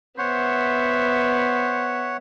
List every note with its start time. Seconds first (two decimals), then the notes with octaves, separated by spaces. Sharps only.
0.18 B3 C5 C#5 E5 F#5